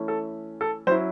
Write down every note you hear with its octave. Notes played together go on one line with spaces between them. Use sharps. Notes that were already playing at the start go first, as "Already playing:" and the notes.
Already playing: E3 A3 C#4 E4
A4
A4
F#3 C#4 E4 C5